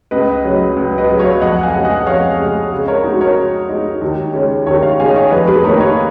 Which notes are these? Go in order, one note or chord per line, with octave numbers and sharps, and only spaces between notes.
C#2 B4 D#5
C#3 F#3 C#4
C#2
B4 D#5
C#3 F#3 C#4
C#5 F5
F2 D#5 F#5
F5 G#5
C#3 G#3
D#5 F#5
F2 C#5 F5
C#3 G#3
C#3
A#4 C#5
G#3 D#4 F#4
A#4 C#5
C#3
G#3 D#4
D#2
C#3 G#3 C#4
D#2 A#4 C#5
C#5 F5
C#3 G#3 C#4 F5 G#5
D#5
C#5 F5
F2 B4 D#5
G#4 B4
D#3 A#3 D#4 A#4 C#5
D#5
C#5 F5